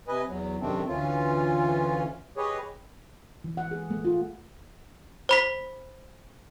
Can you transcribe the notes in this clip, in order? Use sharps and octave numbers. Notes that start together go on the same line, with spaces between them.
C3 B4 D#5 G#5
E2 F#3
F#2 C3 D#3 A3 C4 D4
D2 E3 C#4 F4
G4 G#4 B4 C#5 D#5
E3
F#5
G#4
A3
F4
C5 B5 B6